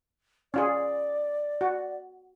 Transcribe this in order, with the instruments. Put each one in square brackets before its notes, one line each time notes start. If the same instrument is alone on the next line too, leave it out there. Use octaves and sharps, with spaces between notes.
[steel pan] C#4 F4 G#4 [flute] D5
[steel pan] F#4